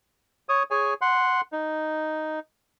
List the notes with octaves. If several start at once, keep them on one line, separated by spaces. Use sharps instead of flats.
C#5 D#6
G#4 C#5 G#5
F#5 C6
D#4